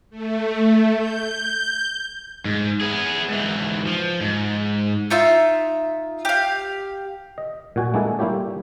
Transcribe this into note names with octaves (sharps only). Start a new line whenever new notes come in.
A3
G6
G#2
B3 G#4
G#2 E3
F3
G#2
D#4 F4 E5
G4 F5
D#5
A#2 F#4 G#5
G#3 A#3 D4 E4 G#4 A4
G3 A#3 E4 F4 G4 C#5